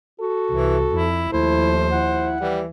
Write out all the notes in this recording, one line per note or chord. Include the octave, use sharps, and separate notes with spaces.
F#4 A4
C2 E3
F2 E4
D#2 F3 A3 E4 C5
E4 F#5
E3 G3